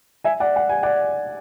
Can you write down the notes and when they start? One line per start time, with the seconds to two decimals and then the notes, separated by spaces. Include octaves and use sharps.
0.24 E5 G#5
0.40 D5 F#5
0.56 F#5
0.69 G#5
0.83 D5 F#5